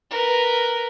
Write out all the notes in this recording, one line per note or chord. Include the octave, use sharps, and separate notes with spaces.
A#4 B4